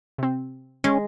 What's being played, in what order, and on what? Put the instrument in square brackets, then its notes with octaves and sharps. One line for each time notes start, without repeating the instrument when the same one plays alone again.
[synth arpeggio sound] C3 C4
[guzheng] G#3 [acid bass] C#4